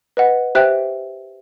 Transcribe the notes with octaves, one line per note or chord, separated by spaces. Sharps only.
B4 D#5 F#5
G4 C5 E5 G5 F#6